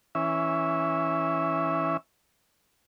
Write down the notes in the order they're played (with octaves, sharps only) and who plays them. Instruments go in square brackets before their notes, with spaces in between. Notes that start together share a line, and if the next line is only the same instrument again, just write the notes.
[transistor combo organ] E3 C#4 E5